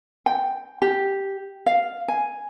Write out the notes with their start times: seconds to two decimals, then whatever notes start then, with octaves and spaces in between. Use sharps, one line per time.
0.26 G5
0.82 G4
1.66 F5
2.08 G#5